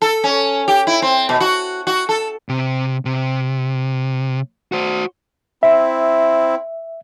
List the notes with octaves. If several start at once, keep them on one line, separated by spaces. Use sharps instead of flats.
A4
C#4
G4
E4
C4
B2
F#4
F#4
A4
C3
C3
F#4 C5
C4 E4 E5